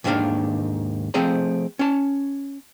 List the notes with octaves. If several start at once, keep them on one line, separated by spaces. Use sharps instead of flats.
D#2 G#2 D#3 A#3 D4 F5
F3 A3 C4 G#4 D#5 A#5
C#4 A5